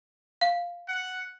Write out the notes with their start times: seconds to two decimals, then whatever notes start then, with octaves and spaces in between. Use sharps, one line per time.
0.41 F5
0.88 F#5